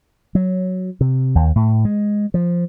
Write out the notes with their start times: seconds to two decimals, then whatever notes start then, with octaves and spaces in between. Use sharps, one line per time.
0.35 F#3
1.01 C3
1.35 D#2
1.56 A2
1.85 G#3
2.34 F3